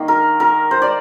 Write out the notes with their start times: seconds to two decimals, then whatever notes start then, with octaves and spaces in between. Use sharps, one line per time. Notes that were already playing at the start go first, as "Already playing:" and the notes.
Already playing: D#3 A#3
0.08 A#4
0.40 A#4
0.71 C5
0.82 D5